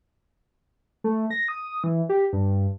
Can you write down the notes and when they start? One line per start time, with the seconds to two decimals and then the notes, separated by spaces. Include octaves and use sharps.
1.04 A3
1.30 A#6
1.48 D#6
1.84 E3
2.09 G4
2.33 G2